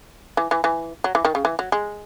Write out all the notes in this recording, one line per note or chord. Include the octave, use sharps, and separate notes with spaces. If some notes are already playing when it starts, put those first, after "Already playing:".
E3
E3
E3
F#3
E3
D#3
C#3
E3
F#3
G#3